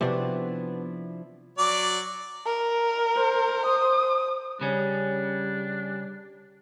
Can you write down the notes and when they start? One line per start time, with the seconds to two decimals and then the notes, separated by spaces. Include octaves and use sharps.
0.01 C3 F3 B3 D4 E4 F#4 D5
1.58 F#3 D5 D6
2.46 A#4
3.16 C5
3.66 D#6
4.61 C#3 G3 C#4 D4